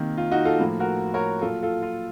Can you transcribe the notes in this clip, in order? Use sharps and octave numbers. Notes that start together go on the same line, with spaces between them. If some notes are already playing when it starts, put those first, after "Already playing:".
Already playing: C3 D#3 A#3
F4
D#4 F#4
F4 A4
A2 F3 A#3
F#4 A#4
A#4 C#5
A#2 F#3 A3 F4 A4
F4 A4
F4